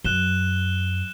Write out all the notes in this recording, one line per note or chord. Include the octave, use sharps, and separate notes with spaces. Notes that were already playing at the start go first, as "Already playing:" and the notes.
F#2 F#6 E7 G7